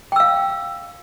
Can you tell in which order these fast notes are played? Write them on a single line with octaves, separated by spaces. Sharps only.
G5 E6 F5